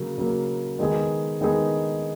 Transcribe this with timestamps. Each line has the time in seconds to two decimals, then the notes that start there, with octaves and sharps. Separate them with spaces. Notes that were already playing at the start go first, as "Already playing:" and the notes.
Already playing: C#3 F#3 A#3
0.18 C#3 F#3 A#3
0.79 D#3 G#3 B3 D#4 G#4
1.41 D#3 G#3 B3 D#4 G#4